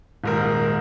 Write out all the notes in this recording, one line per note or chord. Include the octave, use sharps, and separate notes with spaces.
D#1 G#2 A#4